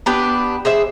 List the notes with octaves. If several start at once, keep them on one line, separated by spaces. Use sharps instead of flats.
B3 D4 G4 B4
G#4 C5 E5